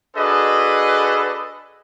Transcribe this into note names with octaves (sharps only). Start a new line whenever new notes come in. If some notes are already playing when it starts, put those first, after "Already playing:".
D4 F#4 G#4 A4 B4 D#5